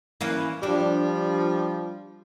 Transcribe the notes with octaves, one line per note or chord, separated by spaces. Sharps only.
E3 A#3 C#4
F3 G3 D4